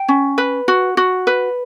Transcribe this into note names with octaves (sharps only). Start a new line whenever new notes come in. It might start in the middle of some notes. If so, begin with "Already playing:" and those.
Already playing: G5
C#4
B4
F#4
F#4
B4